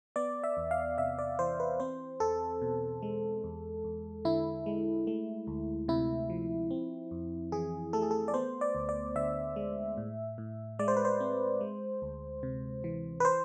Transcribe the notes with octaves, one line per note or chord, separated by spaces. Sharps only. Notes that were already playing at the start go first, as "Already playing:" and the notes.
B3 D5
E5
E2
F5
C3 E5
D5
E3 C5
B4
C4 C5
E2 A4
B2
G#3
E2
E2
D3 E4
G#3
A3
D2
C3 E4
F3
C4
F2
E3 G#4
A3 A4
G#4
A4
D5
B3 C5
D5
D2
D5
D3 E5
G#3
A2
A2
G#3 D5
C5
B4
C5
C4
G#3
D2
C3
E3
B4
C5